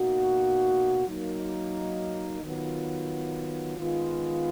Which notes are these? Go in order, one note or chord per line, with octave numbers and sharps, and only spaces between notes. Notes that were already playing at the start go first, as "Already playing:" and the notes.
Already playing: B2 A#3 D#4 F#4
F#3 A#3 D#4
D#3 F#3 B3 F4
D#3 G#3 B3 F4